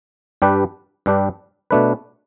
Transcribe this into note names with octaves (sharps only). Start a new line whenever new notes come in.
G2 G3 D4 G4 B4
G2 G3 D4 G4 B4
B2 A3 D4 B4